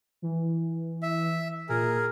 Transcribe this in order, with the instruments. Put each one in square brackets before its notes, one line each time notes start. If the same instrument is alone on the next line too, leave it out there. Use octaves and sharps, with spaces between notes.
[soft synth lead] E3
[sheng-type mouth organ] E5
[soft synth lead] A#2 [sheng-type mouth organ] G#4 A#4